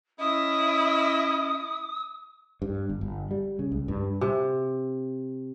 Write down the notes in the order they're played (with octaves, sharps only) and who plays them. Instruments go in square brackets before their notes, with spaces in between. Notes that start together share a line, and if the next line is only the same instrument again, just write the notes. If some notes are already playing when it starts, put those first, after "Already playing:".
[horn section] C#4 D#5 [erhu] E4 [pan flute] D#6
[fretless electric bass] G2
G1
G1
G3
C#3
C#2
G2
[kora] C3